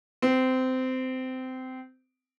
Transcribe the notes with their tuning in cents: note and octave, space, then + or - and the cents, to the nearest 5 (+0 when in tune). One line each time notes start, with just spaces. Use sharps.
C4 -20